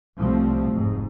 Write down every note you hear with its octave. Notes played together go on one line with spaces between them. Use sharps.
C2 A2 F3 G3 A3 C4
F1 G#2